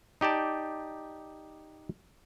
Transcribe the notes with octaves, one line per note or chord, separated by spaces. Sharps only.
D#4 G4 D5 A5